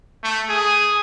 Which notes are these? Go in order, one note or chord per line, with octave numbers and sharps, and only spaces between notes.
A3
G#4